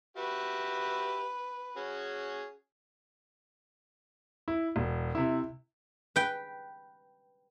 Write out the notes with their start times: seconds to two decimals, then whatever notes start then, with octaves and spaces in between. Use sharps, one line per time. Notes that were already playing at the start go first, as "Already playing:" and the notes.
0.17 F#4 G4 B4 E5
1.77 C#4 F#4 G#4
4.48 E4
4.76 E1
5.15 C3 E4
6.16 B4 G5